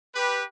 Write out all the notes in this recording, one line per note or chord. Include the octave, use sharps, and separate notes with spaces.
G4 B4